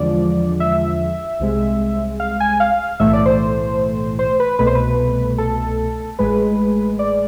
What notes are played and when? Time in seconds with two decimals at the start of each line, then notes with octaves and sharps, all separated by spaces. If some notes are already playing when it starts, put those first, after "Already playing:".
Already playing: E2 D3 F3 G#3 D5
0.60 E5
1.40 C2 C3 G#3
2.20 F5
2.40 G#5
2.60 F5
3.00 B1 A2 E3 A3 E5
3.13 D5
3.26 C5
4.19 C5
4.40 B4
4.59 C2 B2 A3 B4
4.67 C5
4.75 B4
5.38 A4
6.19 A1 A2 G#3 B4
6.99 D5